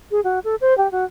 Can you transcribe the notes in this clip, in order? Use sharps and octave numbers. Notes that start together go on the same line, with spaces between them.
G#4
F#4
A4
C5
G4
F#4